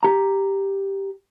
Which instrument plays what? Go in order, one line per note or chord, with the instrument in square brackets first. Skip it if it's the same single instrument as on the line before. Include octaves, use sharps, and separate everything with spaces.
[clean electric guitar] G4 A#5